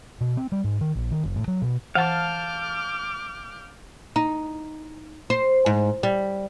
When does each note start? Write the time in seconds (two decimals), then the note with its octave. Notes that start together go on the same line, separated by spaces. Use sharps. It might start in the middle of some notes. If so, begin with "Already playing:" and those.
0.21 B2
0.37 C4
0.52 G3
0.64 G#2
0.81 D#3
0.95 A#1
1.11 D#3
1.24 F#1
1.36 A2
1.48 F#3
1.62 B2
1.95 E3 F5 F#5 A5 D6 F6 G6
4.16 D#4
5.30 C5
5.66 G#2
6.03 G3